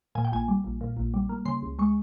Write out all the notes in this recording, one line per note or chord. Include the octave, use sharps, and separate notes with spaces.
A#2 G#5
G5
A#1 G#5
G3
A#1
A#2
A#1
G3
A#3
C#3 C6
C#2
G#3 C#6